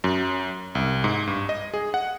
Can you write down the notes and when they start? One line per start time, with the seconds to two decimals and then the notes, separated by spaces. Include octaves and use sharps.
0.04 F#2
0.75 C2
1.04 G#2
1.27 G2
1.49 D#5
1.74 G#4
1.94 F#5